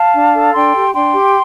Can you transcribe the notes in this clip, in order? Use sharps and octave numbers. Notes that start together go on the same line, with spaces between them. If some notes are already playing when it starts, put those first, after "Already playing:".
Already playing: F5 A5
D4
A4
D4 G5 C6
G4
D4 G5 C6
G4